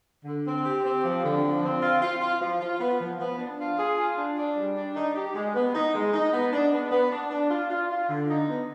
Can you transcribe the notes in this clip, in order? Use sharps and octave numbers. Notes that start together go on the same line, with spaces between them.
D3
C4
G4
C4
F3
D3
F3
C4
F4
F4
F4
F3
F4
B3
F3
B3
D4
F4
G#4
F4
D4
D4
G3
D4
D#4
G4
G#3
B3
D#4
G#3
D#4
B3
D4
B3
B3
D4
D4
F4
F4
F4
D3
D#4
B3